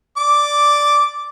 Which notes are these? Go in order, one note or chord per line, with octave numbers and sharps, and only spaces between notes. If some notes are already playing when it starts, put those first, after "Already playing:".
D5 D6